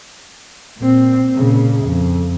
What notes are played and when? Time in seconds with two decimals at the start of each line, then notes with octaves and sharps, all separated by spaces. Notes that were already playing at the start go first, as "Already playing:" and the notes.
0.79 A#2 C4
1.36 A#2 C#3
1.85 F2